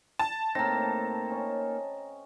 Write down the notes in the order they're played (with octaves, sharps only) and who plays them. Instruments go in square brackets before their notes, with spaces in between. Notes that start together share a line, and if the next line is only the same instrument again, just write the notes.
[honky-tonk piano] A5
[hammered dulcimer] A2 C4 [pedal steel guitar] A#3 D#4 [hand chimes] A#5 A#6
[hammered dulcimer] C#4 D#5 G#5